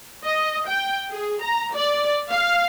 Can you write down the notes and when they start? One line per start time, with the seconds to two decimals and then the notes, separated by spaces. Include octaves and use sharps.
0.25 D#5
0.68 G5
1.10 G#4
1.42 A#5
1.74 D5
2.29 F5